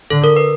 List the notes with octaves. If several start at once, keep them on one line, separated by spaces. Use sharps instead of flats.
D3 A4
A#4
B4